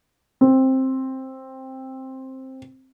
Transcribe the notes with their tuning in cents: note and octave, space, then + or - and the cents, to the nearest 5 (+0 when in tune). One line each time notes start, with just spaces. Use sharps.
C4 +10